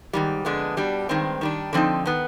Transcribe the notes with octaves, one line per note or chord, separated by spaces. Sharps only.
G#2 D#3 G3
F2 D3 G#3 B3 D4
B2 G3 D4
G2 D#3 G#3 C4
D#3 G3 D4
D3 F3 C4 D#4
D#3 B3